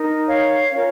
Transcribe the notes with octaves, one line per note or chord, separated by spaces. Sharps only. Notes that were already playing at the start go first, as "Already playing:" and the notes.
Already playing: D#4 A#4
C#5 F5
C#4 F4 A#4 C#5